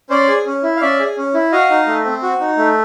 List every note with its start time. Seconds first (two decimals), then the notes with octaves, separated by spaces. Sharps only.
0.10 C#4 C5 D5
0.28 G#4
0.46 C#4
0.63 E4
0.76 F5
0.81 C#4 D5 E5
0.99 G#4
1.17 C#4
1.34 E4
1.52 F#4 D#5 F5
1.70 D#4
1.87 A3
2.04 C4
2.22 F#4
2.40 D#4
2.57 A3